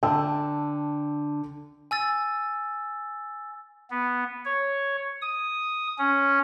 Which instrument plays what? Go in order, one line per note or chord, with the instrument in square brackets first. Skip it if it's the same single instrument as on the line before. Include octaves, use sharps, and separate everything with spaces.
[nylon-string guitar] D3 [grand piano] G5 A5 E6
[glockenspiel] G#5 E6 A6
[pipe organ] B3
C#5
D#6
C#4